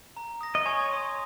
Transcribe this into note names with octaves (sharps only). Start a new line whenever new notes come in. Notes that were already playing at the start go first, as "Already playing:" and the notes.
A#5
D#6 A#6
D#5
C#5 G#5
C6 D#6